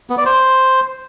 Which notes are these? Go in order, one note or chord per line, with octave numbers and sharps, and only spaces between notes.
B3
D5
C5